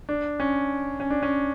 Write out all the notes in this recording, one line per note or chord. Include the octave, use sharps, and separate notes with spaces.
D4
C#4
C#4
D4
C#4